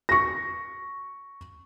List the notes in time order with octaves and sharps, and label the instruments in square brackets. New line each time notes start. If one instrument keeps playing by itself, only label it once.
[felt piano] C#6 A#6